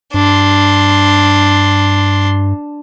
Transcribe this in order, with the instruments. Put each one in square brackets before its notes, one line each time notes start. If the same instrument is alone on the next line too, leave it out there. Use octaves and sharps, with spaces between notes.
[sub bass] G2 [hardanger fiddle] D4 C6